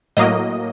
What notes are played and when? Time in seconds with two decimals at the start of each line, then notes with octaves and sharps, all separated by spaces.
0.17 A2 F#3 A#3 D#5